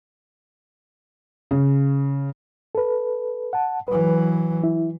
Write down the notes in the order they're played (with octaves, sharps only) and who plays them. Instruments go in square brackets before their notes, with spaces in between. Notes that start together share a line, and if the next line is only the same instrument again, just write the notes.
[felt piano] C#3
[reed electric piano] A4 B4
F#5 A5
[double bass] E3 F#3 [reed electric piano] B4
[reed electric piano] E4